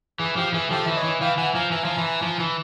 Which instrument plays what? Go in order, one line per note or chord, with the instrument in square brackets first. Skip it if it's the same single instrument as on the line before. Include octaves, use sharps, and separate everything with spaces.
[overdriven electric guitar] E3 [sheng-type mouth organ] G#4
[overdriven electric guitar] F3 [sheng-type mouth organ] G4
[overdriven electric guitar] E3 [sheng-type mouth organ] G#4
[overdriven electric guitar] F3 [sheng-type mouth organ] G4 A4
[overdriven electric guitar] E3 [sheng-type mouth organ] E5
[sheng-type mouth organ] C#5 D#5
[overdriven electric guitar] E3
[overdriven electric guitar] E3 [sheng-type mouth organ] F5 G5
[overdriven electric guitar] E3 [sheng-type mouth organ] F#5 G#5
[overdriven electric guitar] F3 [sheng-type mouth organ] G#5 A#5
[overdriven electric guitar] E3 [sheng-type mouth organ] G#5 A#5
[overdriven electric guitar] F3
E3
F3
E3